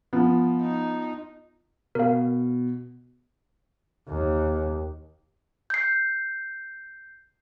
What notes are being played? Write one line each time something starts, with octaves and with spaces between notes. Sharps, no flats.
F3 B3
D#4
B2 A#4 F5
D#2
G6 C7